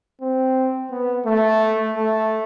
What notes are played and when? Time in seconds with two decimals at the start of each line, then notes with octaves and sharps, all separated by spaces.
0.21 C4
0.91 B3
1.26 A3
1.95 A3